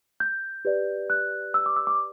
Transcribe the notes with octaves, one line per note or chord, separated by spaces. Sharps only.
G6
G4 B4 D5
F#6
E6
D6
E6
D6